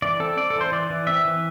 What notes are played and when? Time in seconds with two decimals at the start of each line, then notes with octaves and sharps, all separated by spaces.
0.02 E3 D5
0.20 C4 A4
0.38 C4 D5
0.50 A4
0.55 E3
0.61 C5
0.72 E3 D5
0.90 E3
1.07 C4 E5
1.25 E3